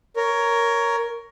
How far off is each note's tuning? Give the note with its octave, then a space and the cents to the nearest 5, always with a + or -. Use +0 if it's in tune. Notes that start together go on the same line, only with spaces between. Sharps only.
A#4 +0 C#5 +10